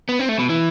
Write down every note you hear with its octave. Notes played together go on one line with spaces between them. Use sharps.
B3
C4
A3
B2
E3